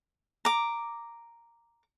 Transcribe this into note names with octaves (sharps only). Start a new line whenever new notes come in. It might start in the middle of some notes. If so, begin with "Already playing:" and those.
A#5 D6